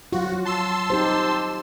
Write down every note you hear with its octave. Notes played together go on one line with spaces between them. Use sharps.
F#3 F4 F#4
A5 C6 E6
D#4 G4 C5